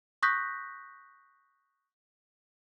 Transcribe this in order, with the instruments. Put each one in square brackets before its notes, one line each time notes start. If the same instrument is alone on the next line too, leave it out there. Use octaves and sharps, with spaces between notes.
[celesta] C#6 D#6 F#6 G6 A#6 B6